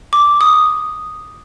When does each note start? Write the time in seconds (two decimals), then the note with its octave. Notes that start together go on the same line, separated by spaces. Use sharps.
0.13 D6
0.41 D#6